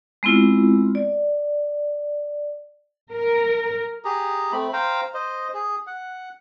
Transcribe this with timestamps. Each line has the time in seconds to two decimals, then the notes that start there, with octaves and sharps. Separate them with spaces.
0.23 G#3 B3 C4 E4 F4
0.95 D5
3.11 A#4
4.05 G4 G#4 A#5
4.52 A3 C4 B5
4.73 C5 F5 G5 A#5
5.14 C5 D#5
5.54 G#4
5.87 F#5